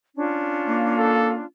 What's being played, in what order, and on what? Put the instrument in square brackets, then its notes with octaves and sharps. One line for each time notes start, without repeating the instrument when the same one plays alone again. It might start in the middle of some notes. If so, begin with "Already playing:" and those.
[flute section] C#4 D4 F4
[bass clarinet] A#3
[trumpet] A4